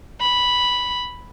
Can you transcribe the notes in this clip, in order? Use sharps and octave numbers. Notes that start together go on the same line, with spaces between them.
B5